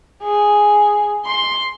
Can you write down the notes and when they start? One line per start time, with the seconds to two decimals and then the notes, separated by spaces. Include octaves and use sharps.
0.23 G#4
1.26 C6